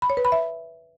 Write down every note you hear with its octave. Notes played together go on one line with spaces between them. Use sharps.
B5
C#5
B4
B5
E5